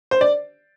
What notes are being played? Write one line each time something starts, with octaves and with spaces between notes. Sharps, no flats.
C5
D5